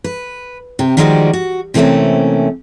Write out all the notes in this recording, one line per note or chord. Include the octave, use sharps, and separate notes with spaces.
B4
C3 G4
D#3 F3 G3 G#3 F#4 D5
F#4
C3 E3 A3 A#3 C4 C#4